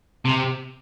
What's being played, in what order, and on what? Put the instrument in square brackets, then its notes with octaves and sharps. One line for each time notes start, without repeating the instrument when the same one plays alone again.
[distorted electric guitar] C3